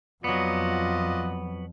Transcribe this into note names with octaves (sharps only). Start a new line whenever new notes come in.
F2 F#3 B3 F4 F#4 D5 D#5